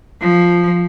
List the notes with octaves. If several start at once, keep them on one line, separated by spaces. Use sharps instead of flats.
F3